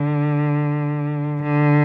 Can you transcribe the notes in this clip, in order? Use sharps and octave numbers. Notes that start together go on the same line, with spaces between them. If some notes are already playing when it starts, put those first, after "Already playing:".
Already playing: D3
D3